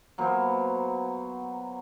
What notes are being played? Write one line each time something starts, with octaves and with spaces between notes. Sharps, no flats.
F#3 A#3 B3 C5